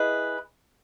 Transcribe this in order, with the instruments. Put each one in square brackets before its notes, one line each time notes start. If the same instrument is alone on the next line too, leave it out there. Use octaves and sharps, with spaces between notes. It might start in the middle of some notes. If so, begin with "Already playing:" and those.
Already playing: [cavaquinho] E4 G#4 B4 D#5